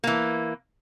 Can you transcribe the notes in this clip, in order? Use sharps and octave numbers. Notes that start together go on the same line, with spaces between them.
E3 A#3